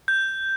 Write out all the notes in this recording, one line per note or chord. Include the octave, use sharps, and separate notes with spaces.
G6